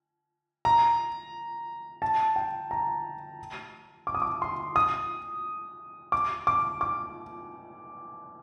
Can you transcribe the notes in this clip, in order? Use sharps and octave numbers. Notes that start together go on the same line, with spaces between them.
A#5
A5
G5
A#5
D6
D#6
D6
C6
D#6
D6
D6
D6